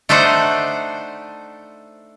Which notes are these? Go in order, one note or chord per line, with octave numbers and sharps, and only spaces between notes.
A3 D4 D#4 C5 F#5